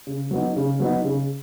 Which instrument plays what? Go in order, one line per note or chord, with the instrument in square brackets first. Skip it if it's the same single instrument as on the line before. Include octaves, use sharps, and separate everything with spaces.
[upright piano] C#3
F#3 B3 D#4
C#3
F#3 B3 D#4
C#3